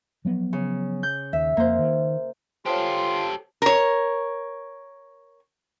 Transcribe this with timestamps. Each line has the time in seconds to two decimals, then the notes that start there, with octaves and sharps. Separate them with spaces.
0.25 F3 F#3 B3
0.53 C#3
1.03 G6
1.33 D#2 E5
1.57 F2 A#3 C5
1.79 D#3
2.66 F4 G4 A4 C5 C#5 C6
3.62 A#4 C#5